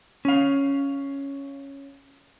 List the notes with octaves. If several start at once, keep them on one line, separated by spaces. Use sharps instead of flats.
C#4 F5